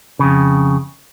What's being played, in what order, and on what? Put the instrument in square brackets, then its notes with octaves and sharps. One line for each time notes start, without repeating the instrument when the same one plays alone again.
[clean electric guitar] F2 C#3